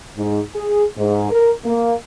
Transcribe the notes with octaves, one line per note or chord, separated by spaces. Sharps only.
G#2
G#4
G#2
A#4
A#3